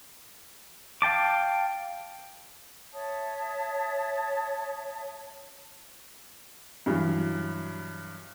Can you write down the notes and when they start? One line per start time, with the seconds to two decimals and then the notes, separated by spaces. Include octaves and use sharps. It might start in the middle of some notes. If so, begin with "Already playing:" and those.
1.02 F5 G5 A5 D6
2.94 C#5 E5 A5 D#6
6.86 G2 B2 E3 F#3